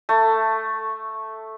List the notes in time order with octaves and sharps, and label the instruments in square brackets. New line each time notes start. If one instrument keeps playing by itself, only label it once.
[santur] A3